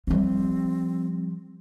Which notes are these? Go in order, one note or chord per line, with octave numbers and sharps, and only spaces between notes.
F3 G3 C4